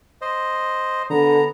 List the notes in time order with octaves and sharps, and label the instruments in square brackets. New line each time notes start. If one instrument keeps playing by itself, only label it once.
[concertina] C5 D#5
[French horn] D3 [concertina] B3 A#5